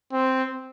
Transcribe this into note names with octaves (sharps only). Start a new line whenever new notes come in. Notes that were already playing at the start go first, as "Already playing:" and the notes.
C4